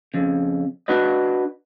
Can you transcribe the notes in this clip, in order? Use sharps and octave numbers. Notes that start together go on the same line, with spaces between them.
F2 C#3
D4 F#4 B4 D#5